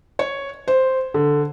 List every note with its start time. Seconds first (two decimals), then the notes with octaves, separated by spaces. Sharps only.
0.19 C#5
0.68 C5
1.14 D3